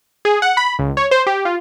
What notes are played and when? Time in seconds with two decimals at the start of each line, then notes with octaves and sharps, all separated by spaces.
0.25 G#4
0.42 F#5
0.57 B5
0.79 C#2
0.97 C#5
1.11 C5
1.27 G4
1.45 F4